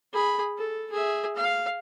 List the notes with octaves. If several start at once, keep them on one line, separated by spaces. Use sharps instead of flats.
G#4 B5
A4
G#4 E5
F5